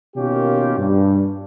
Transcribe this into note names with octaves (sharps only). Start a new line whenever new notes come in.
B2 D#3 A#3 C#4 F4 G4
G2